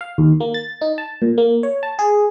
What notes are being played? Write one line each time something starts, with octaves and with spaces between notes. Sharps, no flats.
F5
D#2
A#3
A6
D#4
A5
A#2
A#3
C#5
A5
G#4